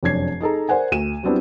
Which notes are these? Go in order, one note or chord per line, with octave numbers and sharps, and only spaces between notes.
F1 F#2 D4 C#5 G#6 C7
D#4 G#4 A4 A#5
A#4 C5 D5 F#5 G#5
D2 D#7 E7
F#3 G3 B3 C4 D4 E4